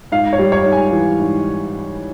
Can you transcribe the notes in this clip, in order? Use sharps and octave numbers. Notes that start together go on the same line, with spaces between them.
G#2 F5
C#5
G3
C#5
G#2
G#5
E3
G#2